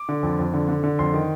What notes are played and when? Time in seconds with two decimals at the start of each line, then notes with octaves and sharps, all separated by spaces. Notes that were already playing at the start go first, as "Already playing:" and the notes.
Already playing: D6
0.09 D3
0.23 F2
0.39 F2
0.54 D3
0.69 D3
0.84 D3
0.99 F2 C6
1.14 D#3